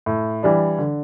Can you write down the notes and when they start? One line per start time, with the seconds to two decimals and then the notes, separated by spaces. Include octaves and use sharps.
0.06 A2
0.43 E3 G3 D4
0.79 D3